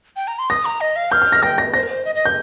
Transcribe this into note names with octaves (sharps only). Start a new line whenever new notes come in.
G5
A#5
C6
D#6 A#6
A#5
D#5
F5
F6 G6
G6
A#6
G5 A#6
A#6
C5 A#6
A#4
C5
D#5
D#5
G6